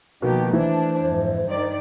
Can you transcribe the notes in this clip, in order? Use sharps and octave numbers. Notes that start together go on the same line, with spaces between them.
B2 D#3 F3 A#3 F#4 G4
E3 A3 D4 C5
F2 G#2
G2 D#3 D5